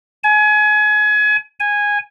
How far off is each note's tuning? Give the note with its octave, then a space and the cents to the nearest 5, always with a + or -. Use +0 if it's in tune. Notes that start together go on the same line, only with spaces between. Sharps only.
G#5 +30
G#5 -10